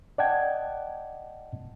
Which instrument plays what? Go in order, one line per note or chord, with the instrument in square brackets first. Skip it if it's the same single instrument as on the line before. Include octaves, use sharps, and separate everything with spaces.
[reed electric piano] D5 D#5 F#5 G5 A5 G#6